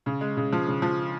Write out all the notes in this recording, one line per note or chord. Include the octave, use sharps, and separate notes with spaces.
C#3
G#3
C#3
F3
C#3
F3